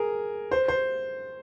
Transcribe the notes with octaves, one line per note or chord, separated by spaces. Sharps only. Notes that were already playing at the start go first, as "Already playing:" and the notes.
Already playing: G#4 A#4
C5
C5